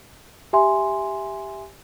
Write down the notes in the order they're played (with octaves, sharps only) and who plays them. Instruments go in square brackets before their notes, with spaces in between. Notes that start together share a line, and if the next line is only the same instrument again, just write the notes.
[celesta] G4 E5 G#5 C6